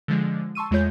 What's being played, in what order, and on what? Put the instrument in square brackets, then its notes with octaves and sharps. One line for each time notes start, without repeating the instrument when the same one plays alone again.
[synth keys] D3 F3 G#3
A5 C6 C#6 E6 D#7
E2 G#3 A3 F4 C#5 G6